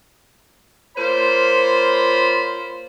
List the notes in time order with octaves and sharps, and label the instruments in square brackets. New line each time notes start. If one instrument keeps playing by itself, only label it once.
[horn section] A#3 F4 C5 C#5 B5